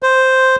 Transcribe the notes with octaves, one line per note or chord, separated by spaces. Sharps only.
C5